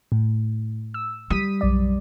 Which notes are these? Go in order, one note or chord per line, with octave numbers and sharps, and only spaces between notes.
A2
E6
G3 D#6 B6 D#7
B1 F#2 D5